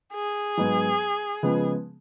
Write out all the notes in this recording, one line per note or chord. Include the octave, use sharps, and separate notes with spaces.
G#4
G#2 F#3 B3
C#3 F3 G#3 B3